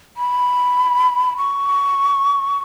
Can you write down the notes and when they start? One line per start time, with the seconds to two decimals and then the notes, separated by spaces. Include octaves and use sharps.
0.17 B5
1.37 C#6